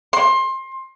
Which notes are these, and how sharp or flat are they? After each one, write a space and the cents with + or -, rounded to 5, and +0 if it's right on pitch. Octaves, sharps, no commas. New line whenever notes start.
C6 +25